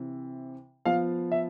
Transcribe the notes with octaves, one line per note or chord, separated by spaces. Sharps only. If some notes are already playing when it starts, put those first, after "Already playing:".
Already playing: C3 E3
F3 B3 F4 F5
E5